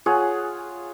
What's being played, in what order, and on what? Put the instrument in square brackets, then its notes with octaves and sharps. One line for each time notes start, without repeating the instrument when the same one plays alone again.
[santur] F4 G#4 C#5 F#5